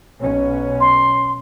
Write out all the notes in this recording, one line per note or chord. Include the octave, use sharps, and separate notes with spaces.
B1 B2 C#4
C6